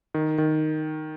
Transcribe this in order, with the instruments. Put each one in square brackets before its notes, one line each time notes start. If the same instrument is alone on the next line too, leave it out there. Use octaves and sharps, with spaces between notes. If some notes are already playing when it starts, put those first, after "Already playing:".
[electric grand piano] D#3
D#3